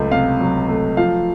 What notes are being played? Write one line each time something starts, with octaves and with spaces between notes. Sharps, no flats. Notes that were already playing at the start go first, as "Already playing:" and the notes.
Already playing: C#2 F#3 A3
C3 F5
F#3
A3
F3 F5